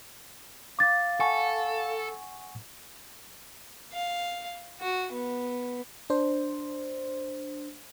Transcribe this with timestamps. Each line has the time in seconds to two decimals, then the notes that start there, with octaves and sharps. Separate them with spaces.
0.79 F5 D6 A6
1.20 A4 F#5 G#5 C#6
3.92 F5
4.81 F#4
5.12 B3
6.10 D4 C5